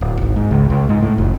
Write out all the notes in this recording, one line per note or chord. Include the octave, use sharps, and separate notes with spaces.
D1
G#1
G#2
C#2
C#2
G#2
A2
F1